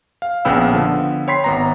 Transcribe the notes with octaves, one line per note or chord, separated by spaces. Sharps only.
F5
A#1 C#3 B3 G5 B5 E6
D3 F3 B3
C#5 G5 B5 C6 B6 C7
G#1 B3 A#5